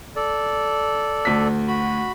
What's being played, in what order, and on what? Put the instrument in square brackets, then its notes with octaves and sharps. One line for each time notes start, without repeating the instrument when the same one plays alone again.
[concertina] A4 D5
[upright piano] D2 B6
[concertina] F#4 B5